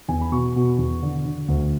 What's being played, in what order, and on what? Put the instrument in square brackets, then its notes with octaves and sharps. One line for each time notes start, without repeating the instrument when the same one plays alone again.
[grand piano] E2 G#5
B5
B2 C#6
B2
E2
D3
D3
D2